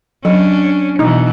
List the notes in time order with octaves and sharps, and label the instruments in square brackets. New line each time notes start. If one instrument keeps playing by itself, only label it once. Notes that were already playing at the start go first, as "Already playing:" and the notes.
[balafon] F#3 [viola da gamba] C#4 D4
[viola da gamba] B2 E3 [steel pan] D#4